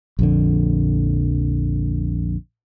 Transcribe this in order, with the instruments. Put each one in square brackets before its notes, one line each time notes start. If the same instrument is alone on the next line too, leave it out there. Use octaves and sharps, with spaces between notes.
[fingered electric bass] A#1 F2 D3